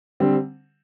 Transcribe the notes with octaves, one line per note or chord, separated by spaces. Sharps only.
D3 G3 C4